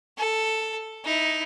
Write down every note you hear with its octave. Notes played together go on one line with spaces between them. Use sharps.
A4
D#4 E4